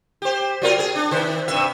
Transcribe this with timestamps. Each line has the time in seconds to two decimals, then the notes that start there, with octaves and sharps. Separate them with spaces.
0.22 G4 C5
0.62 F#3 F4 A#4
0.79 G#4
0.96 D4
1.11 D#3 C5
1.48 G2 C3 E5